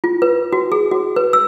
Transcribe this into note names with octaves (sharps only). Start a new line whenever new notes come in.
F4
B4
F#4
G#4
F#4
B4
E6